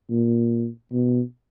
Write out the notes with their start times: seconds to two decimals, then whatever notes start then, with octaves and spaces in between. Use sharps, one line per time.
0.10 A#2
0.92 B2